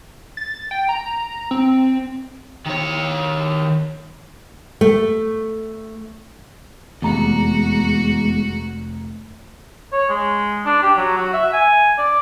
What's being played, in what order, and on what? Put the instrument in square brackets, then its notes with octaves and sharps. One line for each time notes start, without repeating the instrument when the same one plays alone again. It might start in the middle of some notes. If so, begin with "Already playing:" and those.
[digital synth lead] A6
G5
A#5
C4
[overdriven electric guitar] D#3 C#5
[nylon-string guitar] A3
[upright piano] F1 A#5 [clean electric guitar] E2 [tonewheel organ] G#3 [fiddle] F#4
[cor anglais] C#5
G#3
D4
G4
F#3
F#4
E5
G#5
D5